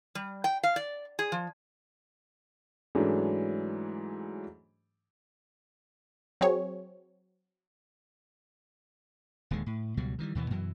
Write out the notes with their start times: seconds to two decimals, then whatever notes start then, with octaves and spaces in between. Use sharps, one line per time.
0.15 G3
0.44 G5
0.63 F5
0.76 D5
1.19 G#4
1.32 F3
2.95 G#2 E3 F#3 A3 C#4 D4
6.41 F#3 C4 G#4 C#5
9.51 D#1 D#2 D3 G#3
9.66 A2
9.97 C#2 B2 F#3 G3
10.19 D#3 E3 F#3 G3
10.35 D#2 B2 E3 B3
10.50 F#2 B2 E3 F#3